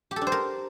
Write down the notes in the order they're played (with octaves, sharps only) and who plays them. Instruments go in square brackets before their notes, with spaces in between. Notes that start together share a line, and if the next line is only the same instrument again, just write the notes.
[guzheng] G4
A4
D4
C5
A#4